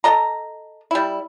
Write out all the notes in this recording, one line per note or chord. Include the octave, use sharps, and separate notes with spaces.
A4 D#5 A#5
G3 E4